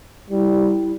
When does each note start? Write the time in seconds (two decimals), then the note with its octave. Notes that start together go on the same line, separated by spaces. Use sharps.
0.30 G3 E4